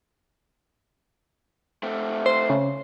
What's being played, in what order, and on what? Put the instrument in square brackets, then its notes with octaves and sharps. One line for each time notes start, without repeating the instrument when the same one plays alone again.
[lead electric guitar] A3 C4
[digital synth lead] C5
C#3